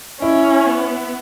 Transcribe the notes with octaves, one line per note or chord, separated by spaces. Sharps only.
C#4 E4
B3